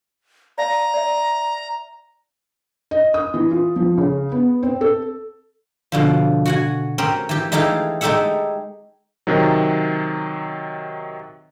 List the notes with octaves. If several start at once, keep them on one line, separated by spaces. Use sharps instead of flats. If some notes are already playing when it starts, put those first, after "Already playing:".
D5 F5 A5 A#5
D5 E5
D#5
D#6
E3
F4
F3
C#3
B3
C4
A4
B2 D3 F3
F#4 F#5 G#5
C4 C#4 G4 A#4
E3 G4
E3 G#3 D#4 G4 A4 F5
G#3 D#4 G4 A4 E5 F#5
C3 D#3 F#3